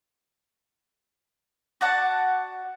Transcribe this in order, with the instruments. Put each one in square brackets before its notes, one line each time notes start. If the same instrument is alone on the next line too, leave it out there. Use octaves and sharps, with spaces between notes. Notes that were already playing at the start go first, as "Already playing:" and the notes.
[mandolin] F#4 D5 F#5 A5